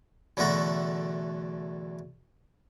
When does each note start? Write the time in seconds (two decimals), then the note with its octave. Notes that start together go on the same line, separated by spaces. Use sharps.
0.37 B1 E2 D3 A3 F#4 A#5